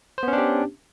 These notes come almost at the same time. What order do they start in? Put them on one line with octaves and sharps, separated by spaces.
C5 B3 C#4 D4 G4